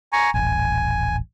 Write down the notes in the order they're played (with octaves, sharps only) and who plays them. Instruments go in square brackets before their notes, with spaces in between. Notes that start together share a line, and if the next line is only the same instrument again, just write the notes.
[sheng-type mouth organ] G#5 A#5 C#6
[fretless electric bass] D#1 A1 [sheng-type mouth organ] G#5